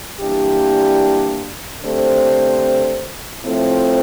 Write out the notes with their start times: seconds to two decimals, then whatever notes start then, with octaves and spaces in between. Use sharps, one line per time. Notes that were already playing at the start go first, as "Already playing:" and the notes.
0.21 E3 G3 A#3 D4 G4
1.82 D3 A3 C4 G4 C5
3.43 A2 F3 A3 C4